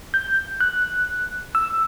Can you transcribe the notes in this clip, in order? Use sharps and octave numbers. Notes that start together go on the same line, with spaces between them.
G6
F#6
E6